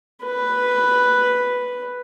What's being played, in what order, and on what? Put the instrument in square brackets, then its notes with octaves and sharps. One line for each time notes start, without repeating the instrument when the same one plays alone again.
[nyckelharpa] B4